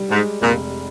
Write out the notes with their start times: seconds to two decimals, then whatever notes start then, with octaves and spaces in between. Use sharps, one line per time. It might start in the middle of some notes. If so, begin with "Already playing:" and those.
Already playing: G3
0.11 G#2 G#3
0.42 F1 A#2